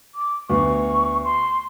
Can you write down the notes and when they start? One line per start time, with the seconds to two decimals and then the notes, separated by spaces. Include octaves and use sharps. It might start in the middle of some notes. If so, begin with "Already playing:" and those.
0.15 D6
0.50 D2 B3 C#6
1.25 C6